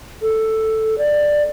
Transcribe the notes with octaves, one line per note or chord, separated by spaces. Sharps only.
A4
D5